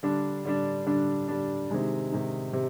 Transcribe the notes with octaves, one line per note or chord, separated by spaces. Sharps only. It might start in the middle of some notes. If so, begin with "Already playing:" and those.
D3 G3 D4
D3 G3 D4
D3 G3 D4
D3 G3 D4
C3 D#3 G#3 D#4
C3 D#3 G#3 D#4
C3